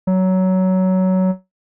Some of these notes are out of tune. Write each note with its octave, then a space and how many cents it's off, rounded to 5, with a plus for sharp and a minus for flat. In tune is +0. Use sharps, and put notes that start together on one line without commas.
F#3 +15